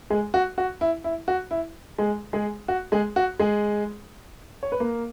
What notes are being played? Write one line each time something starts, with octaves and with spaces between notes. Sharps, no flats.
G#3 G#4
F#4
F#4
E4
E4
F#4
E4
G#3 G#4
G#3 G#4
F#4
G#3 G#4
F#4
G#3 G#4
C#5
B4
A#3 A#4